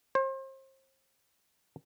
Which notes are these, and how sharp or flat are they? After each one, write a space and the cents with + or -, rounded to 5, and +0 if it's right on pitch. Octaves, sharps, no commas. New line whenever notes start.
C5 +35